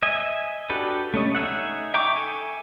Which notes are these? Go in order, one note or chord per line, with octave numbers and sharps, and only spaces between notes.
D#5 E5 G#5
D4 F#4 G4 A4 B4
A3 C#4 D#5
D#4 G#4 E5 F#5
E5 G5 A#5 C#6 D6
A4 G#5